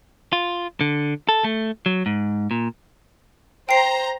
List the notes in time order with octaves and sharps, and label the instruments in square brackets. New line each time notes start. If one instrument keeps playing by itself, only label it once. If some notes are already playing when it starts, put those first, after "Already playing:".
[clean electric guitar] F4
D3
A4
A3
F#3
G#2
A#2
[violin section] C5 A#5 [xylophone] G5 C7